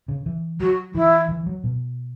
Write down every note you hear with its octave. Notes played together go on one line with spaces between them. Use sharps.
C#3
E3
F#3 F#4
E3 E4
E3
F#3
B2